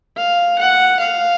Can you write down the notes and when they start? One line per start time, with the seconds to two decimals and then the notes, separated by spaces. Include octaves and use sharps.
0.17 F5
0.59 F#5
1.00 F5